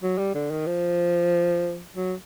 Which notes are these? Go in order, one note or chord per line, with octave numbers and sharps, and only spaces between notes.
F#3
G3
D3
D#3
F3
F#3